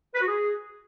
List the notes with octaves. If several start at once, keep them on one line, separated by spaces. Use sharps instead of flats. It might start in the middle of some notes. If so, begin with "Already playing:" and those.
B4
F#4
G#4